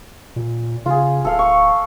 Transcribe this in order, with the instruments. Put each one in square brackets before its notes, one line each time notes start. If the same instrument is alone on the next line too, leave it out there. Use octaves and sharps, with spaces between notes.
[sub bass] A#2
[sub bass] C#3 [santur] F4 G#4
[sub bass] D1 [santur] A4 F5
[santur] C#6